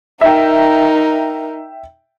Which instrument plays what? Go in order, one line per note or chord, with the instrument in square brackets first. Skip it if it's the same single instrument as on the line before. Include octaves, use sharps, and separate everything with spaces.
[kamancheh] D#4 A#4 [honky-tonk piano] E5 G5